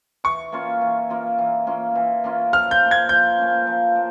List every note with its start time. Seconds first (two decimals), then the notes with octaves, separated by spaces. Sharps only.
0.24 E3 C#6
0.52 A#3 C#4 F4
0.81 E3
1.10 A#3 C#4 F4
1.38 E3
1.67 A#3 C#4 F4
1.95 E3
2.24 A#3 C#4 F4
2.53 F3 F6
2.71 G6
2.81 A#3 C#4
2.91 G#6
3.09 F3 G6
3.38 A#3 C#4
3.67 F3
3.96 A#3